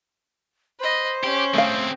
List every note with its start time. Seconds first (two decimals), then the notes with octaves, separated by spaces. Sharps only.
0.80 B4 C5 D#5
1.24 C#4 G4
1.54 A3 C4 G#4 F5